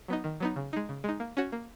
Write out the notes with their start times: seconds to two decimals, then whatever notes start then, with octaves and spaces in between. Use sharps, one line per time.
0.08 F#3 B3 D#4
0.24 D#3
0.40 F#3 B3 D#4
0.56 C#3
0.73 G#3 D#4
0.89 C#3
1.04 G#3 D#4
1.20 A#3
1.37 C#4 F#4 C#5
1.52 A#3